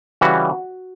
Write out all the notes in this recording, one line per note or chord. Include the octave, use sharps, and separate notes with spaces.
C#3 E3 G3 F#4